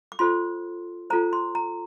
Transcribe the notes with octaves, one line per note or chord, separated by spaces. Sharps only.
D6
F4 A4 C5 C6
F4 A4 C5 A#5
C6
A#5